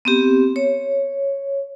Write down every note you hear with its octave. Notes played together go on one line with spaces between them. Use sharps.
B3 C4 G4
C#5